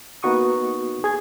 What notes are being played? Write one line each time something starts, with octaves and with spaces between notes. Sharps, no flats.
A#3 B3 D#4 F#4 C#6 D#6
G#4 G#6